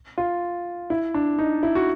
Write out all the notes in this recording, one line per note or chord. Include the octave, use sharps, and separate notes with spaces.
F4
E4
D4
D#4
E4
F#4